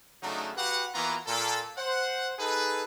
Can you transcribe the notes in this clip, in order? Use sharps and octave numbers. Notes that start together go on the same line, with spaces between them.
C#3 F#3 A3 D4 D#4
F#4 G4 B4 F5 F#5
E3 A#3 B3 F4 F#4 A#5
A#2 A4
C5 F#5
D#4 G#4 A4 B4